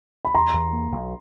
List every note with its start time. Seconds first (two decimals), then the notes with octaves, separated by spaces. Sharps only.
0.25 B5
0.35 E2 A#5 C6
0.54 E2
0.73 A#3
0.92 B1